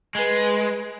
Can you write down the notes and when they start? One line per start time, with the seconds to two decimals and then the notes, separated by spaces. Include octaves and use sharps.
0.15 G#3 B4